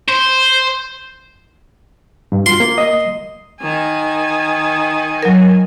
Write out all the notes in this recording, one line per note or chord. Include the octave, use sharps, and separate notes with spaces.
C5
G2
F4 F#4 C6
A#3
D#5
D#3 G#5
F#3 A#4